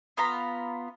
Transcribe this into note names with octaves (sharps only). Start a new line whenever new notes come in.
B3 F4 A#5 B5